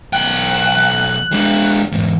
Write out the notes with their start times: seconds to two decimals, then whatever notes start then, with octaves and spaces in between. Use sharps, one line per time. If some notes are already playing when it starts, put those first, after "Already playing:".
0.13 B1 G5 F#6
1.32 G#3 D4
1.92 E2 G#2